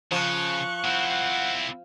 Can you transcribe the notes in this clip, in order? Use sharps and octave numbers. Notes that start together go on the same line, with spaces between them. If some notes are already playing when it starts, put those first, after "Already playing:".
C#3 F3 C#6 F#6
C4 E4 F#5